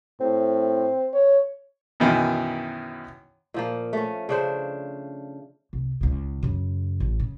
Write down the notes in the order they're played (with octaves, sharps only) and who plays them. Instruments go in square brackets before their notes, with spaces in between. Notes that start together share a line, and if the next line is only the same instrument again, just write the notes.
[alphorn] A2 [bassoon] C4
[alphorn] C#5
[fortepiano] F#2 B2 D#3 E3
[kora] A#2 F3 A#3
A3 C#4
C#3 D4 C5
[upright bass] C2
C#2 C#3
F#2 C#3
A1
C#3